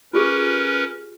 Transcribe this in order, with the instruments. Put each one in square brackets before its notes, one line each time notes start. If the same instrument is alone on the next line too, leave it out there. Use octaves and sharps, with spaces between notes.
[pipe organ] C#4 A#4 B4 [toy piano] F4 G4 G#4